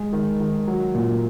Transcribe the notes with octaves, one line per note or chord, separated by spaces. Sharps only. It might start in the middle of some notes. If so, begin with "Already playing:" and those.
Already playing: G#3
D#3
D#3
F#3
A#2